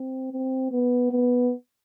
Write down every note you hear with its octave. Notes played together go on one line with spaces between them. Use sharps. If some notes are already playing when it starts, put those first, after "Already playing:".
Already playing: C4
C4
B3
B3